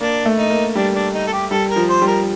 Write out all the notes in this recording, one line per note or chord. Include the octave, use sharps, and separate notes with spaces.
A#3 D4
A3
D#4
A#3
G3 D4
D4
D#4
A4
G4
G3 A4
A#4
F3
C5
G3
A#4